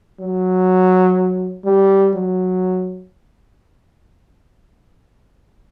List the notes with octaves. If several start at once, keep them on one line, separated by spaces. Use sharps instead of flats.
F#3
G3
F#3